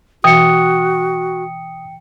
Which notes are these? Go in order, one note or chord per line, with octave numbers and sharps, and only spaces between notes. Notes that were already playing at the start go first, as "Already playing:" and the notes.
B2 E3 F#4 G5 D#6 C#7